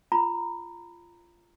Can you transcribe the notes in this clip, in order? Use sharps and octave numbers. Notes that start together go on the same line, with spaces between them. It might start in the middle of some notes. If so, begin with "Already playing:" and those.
F4 A#5 B5